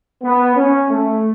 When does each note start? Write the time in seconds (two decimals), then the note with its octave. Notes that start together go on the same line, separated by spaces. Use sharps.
0.23 B3
0.56 C#4
0.89 A3